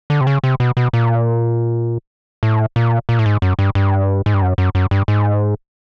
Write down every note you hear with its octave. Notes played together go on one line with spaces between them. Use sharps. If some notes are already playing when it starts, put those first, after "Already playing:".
D3
C3
C#3
C3
B2
B2
A#2
A2
A#2
A#2
A2
G#2
F#2
G2
G2
G#2
G2
F#2
F#2
F#2
G2
G#2